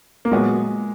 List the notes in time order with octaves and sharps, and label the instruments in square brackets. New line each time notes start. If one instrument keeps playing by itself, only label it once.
[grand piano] A#3
[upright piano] A#2 F#3 B3 F#4 [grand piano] G#3